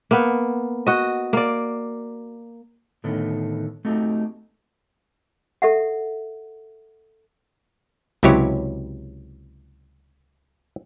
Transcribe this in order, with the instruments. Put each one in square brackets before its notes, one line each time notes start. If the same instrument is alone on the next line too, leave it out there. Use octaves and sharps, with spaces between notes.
[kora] A#3 B3
F#4 D#5
A#3 D5
[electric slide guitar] A2 D3 D#3 A3 B3
A3 C4 D#4 F#4 G4
[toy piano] A4 E5 F#5
[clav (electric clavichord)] C#2 C3 F#3 E4 G4 C#5